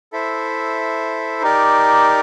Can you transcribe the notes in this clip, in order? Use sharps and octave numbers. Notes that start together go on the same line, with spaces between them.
E4 A4 C5 E5
D#4 G4 A#4 D5